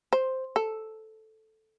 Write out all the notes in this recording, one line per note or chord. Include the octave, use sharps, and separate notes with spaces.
C5
A4